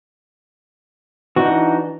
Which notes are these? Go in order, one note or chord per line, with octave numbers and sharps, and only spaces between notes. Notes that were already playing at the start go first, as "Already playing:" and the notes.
E3 D4 D#4 F#4